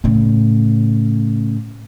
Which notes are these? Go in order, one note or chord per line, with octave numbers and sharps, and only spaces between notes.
A2 C#3